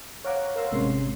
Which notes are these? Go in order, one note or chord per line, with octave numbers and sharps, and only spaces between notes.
C#5 F5 F#5 A#5 D6
A#4 C#5 F5 A#5 C6 E6
G#1 C3 G#3 C#4 C6